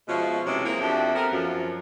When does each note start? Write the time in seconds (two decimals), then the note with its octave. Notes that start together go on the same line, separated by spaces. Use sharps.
0.08 B2 F3 G#3 C#4 F4 E5
0.46 C3 E3 F#3 G#3 C#4
0.65 A#3 C4 E4 G#4
0.80 F2 D4 F#4 G4 E5
1.14 B3 C4 A4 A#4
1.32 F#2 F3